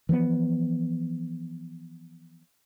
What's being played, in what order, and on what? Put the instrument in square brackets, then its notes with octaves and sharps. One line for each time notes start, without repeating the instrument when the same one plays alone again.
[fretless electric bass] E3 F3 G#3 B3